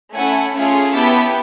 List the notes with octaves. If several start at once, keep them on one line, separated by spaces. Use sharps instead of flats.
A3 C#4 E4 A4 F#5 G#5
A3 C#4 F4 G#4
B3 E4 G4 A5 B5